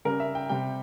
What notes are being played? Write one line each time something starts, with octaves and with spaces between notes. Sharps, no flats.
C#3 G3 A#4
E5
G5
C3 G3 G5